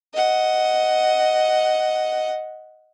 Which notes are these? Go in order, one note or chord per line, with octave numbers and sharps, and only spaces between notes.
D#5 F#5